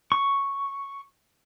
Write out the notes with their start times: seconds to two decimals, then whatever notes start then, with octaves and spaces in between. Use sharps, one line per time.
0.12 C#6